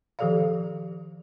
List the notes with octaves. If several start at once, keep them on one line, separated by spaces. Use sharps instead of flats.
D#3 F3 G4 A4 D5 F5